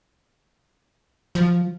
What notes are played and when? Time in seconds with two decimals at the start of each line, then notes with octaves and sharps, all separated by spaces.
1.35 F3